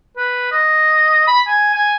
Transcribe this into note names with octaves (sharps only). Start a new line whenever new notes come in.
B4
D#5
B5
G#5
G#5